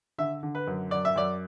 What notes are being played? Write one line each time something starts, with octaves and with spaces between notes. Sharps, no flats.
D3 E5
D3
B4
F#2
F#2 D5
E5
F#2 D5